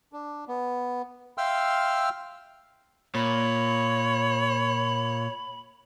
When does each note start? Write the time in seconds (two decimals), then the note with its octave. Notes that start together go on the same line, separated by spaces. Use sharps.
0.13 D4
0.48 B3
1.38 E5 F5 G5 C6 E6 F6
3.15 A#2 C#5 B5